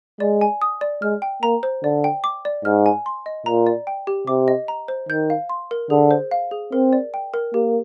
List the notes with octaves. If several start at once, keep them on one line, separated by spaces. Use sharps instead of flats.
G#3 D5
G#5
D#6
D5
G#3 F6
G5
A#3 A#5
C5
D3 D5
G5
D6
D5
G#2 F6
G#5
C6
D#5
A#2 A#5
D5
G5
G4
C3 D6
D#5
A#5
C5
D#3 G6
F5
C6
A#4
D3 G#4
C5
F5
G#4
C4 A#4
D5
G5
A#4
A#3 G4